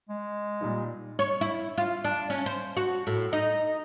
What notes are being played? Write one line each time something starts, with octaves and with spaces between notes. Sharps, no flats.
G#3
A#2 G3 D#4
C#5
E4
F4
D4
C#4
C5
F#4
A2
D#4